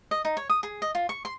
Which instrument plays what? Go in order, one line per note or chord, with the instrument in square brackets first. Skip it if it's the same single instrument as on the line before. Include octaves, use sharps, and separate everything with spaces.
[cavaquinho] D#5
D#4
C#5
D#6
G#4
D#5
F4
C#6
C6